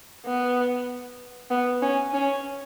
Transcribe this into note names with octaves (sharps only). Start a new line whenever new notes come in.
B3
B3
C#4
C#4